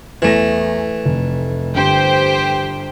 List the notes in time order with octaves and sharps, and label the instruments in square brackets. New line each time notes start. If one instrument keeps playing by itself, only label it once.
[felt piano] E2 A#6 [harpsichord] E3 A3
[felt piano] F1
[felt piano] G1 [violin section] G4 C5 G5